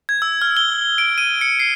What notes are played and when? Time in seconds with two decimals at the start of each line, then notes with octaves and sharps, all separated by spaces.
0.09 G#6
0.22 E6
0.42 F6
0.57 G7
0.98 D7
1.18 D#7
1.41 C#7
1.60 C7